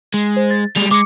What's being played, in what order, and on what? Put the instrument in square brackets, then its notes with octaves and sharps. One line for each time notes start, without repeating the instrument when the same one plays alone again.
[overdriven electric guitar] G#3
[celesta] C5
A6
[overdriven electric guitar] G3 G#3 [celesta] F7
[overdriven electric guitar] G#3 [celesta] D6 C#7